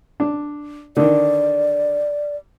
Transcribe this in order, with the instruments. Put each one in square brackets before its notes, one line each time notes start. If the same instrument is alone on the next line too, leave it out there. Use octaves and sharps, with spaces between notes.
[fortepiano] D4
[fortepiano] D3 D#3 [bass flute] D5